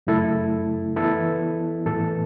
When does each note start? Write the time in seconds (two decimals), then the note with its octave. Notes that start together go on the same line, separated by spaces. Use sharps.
0.07 F#2 C#3 A3 E4 A4
0.96 E3 B3 E4 A4
1.86 A2 E3 B3 A4